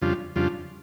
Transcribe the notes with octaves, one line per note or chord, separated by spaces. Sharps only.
F2 C#3 G3 D4 F4
F2 C#3 G3 D4 F4